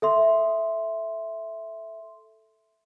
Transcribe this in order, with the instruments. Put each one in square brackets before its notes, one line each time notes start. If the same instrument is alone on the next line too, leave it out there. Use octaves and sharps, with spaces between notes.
[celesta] A4 E5 C6